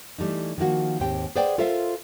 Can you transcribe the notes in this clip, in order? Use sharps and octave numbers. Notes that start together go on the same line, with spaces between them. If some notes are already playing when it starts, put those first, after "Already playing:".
E3 G3 A3 D#4
D#3 F3 A#3 F#4
D#2 G#2 C4 G4 G5
G#4 B4 C5 D5 F#5 G5
F4 A4 A#4 C5 E5 F5